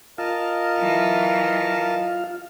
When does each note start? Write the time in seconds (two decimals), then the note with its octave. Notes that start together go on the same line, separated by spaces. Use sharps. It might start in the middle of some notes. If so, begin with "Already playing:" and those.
0.18 F4 A#4 D#5 F5 A5
0.78 E3 F#3